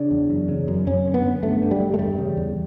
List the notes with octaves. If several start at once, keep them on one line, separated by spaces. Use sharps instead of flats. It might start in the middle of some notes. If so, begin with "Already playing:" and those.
Already playing: C#3 D4
E2
F#2
C#3
F#2
F#2 C#4
D3
B3
F#2
G2 A3
D3
G3
G2
A3
E2 G3
C#3
E2